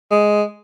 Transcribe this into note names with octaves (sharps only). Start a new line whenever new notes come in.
G#3